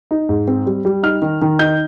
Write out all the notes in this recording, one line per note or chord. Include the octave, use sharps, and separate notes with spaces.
D#4
G#2
C4
G3
G3
D#4 F6
D#3
D#3
D#4 G6